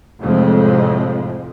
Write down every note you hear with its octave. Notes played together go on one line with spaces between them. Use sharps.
F1 F2 A2 F3 G#3